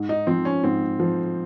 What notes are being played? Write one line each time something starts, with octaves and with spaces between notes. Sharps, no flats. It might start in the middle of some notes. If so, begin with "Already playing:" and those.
Already playing: G#2
D#4
F3 C4
C#4
G#2 C4
F3